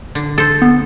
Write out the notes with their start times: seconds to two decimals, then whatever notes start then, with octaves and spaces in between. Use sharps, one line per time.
0.15 D3
0.38 A4 C5
0.62 B3